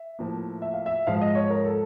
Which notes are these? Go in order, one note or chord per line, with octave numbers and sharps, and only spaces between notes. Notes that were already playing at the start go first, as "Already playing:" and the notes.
Already playing: E5
A2 F3 A#3
E5
F5
E5
G#2 F3 G#3 F5
D#5
C#5
A#4
A4